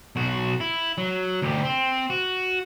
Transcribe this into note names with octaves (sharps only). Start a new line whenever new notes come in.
B1 F#4
E4
F#3
D2 G4
C4
F#4